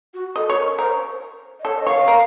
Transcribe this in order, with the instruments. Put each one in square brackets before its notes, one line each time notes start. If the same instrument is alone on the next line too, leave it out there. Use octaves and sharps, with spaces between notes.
[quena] F#4
[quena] A4 [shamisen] D#5
[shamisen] C#5
[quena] A#4
C#5
[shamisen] A#4 [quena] C5
[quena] D#5
[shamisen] A4 [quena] C#5
[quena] D#5
[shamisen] C#5 [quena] F5
[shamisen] A#4